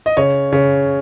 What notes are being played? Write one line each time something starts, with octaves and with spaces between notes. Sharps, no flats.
D#5
C#3 C#5
C#3 C#5